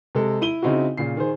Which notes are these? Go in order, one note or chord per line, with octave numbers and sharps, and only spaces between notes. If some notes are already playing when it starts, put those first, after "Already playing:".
C3 G#3 A4
E4 D#7 G7
C#3 C4 D#4 E4 F#4
A#2 C#3 C7
D#3 G#4 C5